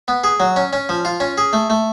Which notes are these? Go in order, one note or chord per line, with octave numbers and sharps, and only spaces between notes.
B3
G#4
F#3
C#4
C#4
F3
F4
C#4
G#4
A3
A3